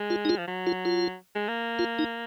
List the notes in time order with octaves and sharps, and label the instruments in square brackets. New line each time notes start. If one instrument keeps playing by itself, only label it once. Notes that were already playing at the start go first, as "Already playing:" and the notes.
Already playing: [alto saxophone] G#3
[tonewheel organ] F4
D#4
F4
[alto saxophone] F3
F#3
[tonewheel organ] F4
F4
[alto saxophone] G#3
A#3
[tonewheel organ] F4
D#4